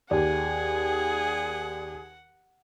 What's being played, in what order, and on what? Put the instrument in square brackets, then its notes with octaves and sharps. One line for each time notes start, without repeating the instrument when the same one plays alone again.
[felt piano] D#2 [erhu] G#4 [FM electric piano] D5 [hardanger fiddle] F#5